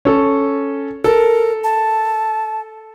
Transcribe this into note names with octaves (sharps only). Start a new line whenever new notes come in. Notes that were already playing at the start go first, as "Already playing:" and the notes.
C#4 A4
A4 A#4
A5